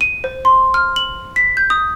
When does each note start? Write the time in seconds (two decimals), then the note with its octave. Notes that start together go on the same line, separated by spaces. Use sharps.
0.01 D#7
0.24 C5
0.45 C6
0.74 F6
0.96 F#7
1.36 B6
1.57 G6
1.70 D#6